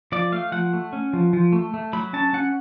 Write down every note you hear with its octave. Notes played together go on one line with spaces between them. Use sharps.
F3 D5
A3 F5
F3 F#5
A3
C#4
F3
F3
A3
A3
F#3 B5
C#4 A5
C#4 F#5